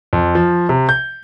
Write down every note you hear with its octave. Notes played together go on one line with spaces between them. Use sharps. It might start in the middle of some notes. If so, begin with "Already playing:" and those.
F2
F3
C3
G6